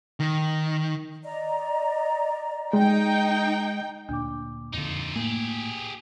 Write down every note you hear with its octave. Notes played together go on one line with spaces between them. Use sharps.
D#3
D5 D#5 A#5
G#3 D#4 G5
D2 A#2 D4 D6
F2 D3 D#4 F4
A2 A#3 G4 G#4